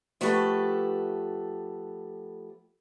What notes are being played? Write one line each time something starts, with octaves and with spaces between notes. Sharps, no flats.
F3 A3 F#4 G4 A4 B4